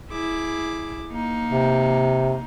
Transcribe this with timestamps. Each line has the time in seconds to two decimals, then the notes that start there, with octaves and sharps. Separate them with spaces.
0.11 E4 G#4 D6
1.11 A#3 D#4
1.52 C3